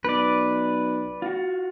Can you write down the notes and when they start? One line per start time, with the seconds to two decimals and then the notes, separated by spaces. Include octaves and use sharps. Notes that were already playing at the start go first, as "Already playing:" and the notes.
0.05 B1 B4 D5
1.22 F4 F#4